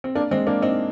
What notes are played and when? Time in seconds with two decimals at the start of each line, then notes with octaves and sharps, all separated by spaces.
0.04 C4
0.15 A#3 D4
0.31 G#3 C4
0.47 A#3 D4
0.62 C4 D#4